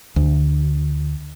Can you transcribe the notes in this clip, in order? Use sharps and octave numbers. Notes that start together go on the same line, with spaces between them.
D2